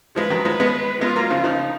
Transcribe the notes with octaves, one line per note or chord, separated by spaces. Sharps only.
F3 G#3 B4
D#3 F#3
F3 G#3
G#3 B3
G#3 B3 F4
F#3 A#3
C#3 F3
C#3 F3 D#4